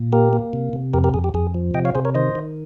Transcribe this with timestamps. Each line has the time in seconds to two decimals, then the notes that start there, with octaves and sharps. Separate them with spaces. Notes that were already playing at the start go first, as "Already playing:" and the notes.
Already playing: A#2
0.12 A#3 G4 A#4
0.33 A#3
0.53 C3
0.73 C3
0.94 F2 G4 A#4
1.04 G4 A#4
1.14 F2 G#4
1.24 G4
1.34 F2 G#4
1.54 F3
1.74 C3 D#5 G5
1.85 C#5 F5
1.95 C3 G#4 C5
2.05 A#4 C#5
2.15 D#3 C5 D#5
2.35 D#3